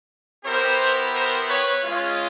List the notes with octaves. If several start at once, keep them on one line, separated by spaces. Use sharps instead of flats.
B3 E4 G4 A#4 C5
A#4 C5
B4 C#5
G#3 C#4 F4